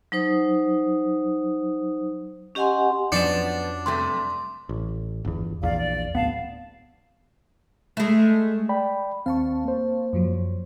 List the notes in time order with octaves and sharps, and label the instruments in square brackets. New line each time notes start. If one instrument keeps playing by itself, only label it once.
[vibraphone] F#3 D#4 C5 D#6
C#4 G4 D#5 F#5 G#5 C6
[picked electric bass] F2 F#3 C#4 [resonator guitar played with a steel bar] F3 B3 [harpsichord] D4 [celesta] C#7 E7
[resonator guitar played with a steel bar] G2 C3 A3 [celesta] C6
[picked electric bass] A1
G1 E2
[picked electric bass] A#1 E2 [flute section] D5 F5
[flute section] D5
[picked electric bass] D1 B3 [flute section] F5 A5
[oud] G#3 A3
[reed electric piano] D5 G5 B5
[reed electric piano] D#2 C4 [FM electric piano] F5 A5 C#6
[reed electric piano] A#3 C5
[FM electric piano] F#2 F3 F#3